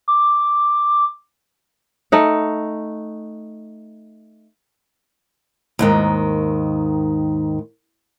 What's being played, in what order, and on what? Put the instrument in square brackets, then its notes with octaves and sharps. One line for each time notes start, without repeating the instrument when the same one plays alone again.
[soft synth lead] D6
[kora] A3 D#4 F#5
[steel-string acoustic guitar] D#2 G#2 D#3